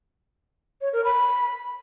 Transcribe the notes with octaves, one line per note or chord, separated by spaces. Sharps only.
C#5
A#4
B5